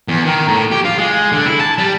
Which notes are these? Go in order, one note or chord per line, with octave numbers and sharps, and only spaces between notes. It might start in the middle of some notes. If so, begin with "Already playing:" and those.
E2
D#3
A2
G4
F4
G#3
D3
E4
A5
G3